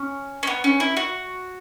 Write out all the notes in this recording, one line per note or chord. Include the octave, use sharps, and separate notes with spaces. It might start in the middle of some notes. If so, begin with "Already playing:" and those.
Already playing: C#4
C#4
B3
C#4
E4
F#4